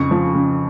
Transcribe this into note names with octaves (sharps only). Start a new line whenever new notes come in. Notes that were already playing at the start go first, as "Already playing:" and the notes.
Already playing: F2 C#3 C#6
F3
C#3